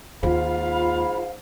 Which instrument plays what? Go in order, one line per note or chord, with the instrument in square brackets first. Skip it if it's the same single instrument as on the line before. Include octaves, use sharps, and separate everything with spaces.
[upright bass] D#2 [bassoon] G#2 [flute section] F4 B5 [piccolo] F5